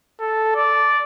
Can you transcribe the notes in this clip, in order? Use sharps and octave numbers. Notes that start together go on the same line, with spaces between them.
A4
D5